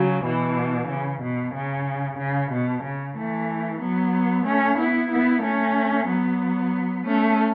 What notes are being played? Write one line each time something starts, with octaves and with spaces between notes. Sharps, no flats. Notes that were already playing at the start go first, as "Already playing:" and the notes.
Already playing: C#3 F#3
B2 E3
C#3
B2
C#3
C#3
B2
C#3
E3 A3
F#3 B3
A3 C#4
B3 E4
B3 E4
A3 C#4
F#3 B3
A3 C#4